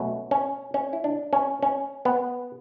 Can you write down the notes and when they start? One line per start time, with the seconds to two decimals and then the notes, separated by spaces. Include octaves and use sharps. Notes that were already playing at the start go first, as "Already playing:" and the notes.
Already playing: B2 F#3 A3 C#4
0.31 C#4
0.74 C#4
0.93 E4
1.04 D4
1.33 C#4
1.63 C#4
2.05 B3